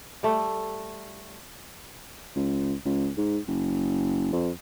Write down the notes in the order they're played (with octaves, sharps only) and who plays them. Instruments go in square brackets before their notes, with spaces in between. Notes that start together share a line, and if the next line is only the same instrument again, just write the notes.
[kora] G3 A3
[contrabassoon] C#2
C#2
G#2
F#1
F2